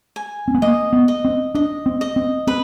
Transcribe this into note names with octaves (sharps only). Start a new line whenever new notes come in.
G#5
C4
B3
A#3 D#5
B3
D#5
C4
D4 D#5
C4
D#5
C4
C4 B4